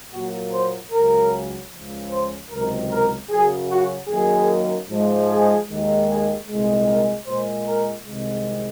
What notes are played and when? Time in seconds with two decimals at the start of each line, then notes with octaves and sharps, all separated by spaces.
0.13 A#2 F#3 A#3 F#4
0.52 C5
0.92 C#2 C#3 F#3 A#4
1.71 C#2 C#3 F3
2.11 C5
2.50 C#2 C3 D#3 F#3 A#4
2.90 A#4
3.30 F#2 C#3 F#3 G#4
3.70 F#4
4.08 F#2 D#3 A#3 G#4
4.89 G#2 F3 G#3
5.28 G#4
5.67 D#2 D#3 G#3
6.07 G#4
6.47 C2 A#2 G#3
6.86 A#4
7.26 A#2 G#3 C5
7.66 A#4
8.05 C2 C3 D#3 G#3